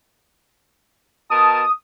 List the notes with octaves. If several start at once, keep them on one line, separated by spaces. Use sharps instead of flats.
B2 A#4 A5 D#6